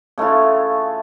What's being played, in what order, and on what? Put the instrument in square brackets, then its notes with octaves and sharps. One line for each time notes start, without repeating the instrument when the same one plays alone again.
[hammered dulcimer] C#3 A3 E4 F4